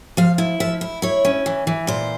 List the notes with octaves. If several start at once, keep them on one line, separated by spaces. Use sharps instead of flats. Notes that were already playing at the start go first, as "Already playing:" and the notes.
F3 F5
E4
F3 E5
E4
E4 C#5
C#4
E3
E3
A#2 C5